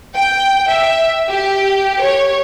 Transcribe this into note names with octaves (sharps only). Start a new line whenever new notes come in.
G5
E5
G4
C#5